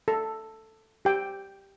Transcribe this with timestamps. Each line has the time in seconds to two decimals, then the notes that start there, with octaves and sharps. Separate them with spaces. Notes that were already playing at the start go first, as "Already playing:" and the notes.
0.08 A4
1.05 G4 G5